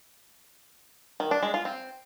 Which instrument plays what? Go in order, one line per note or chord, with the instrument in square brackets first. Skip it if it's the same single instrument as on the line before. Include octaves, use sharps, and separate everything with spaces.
[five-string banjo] D#3
D4
G#3
F4
C4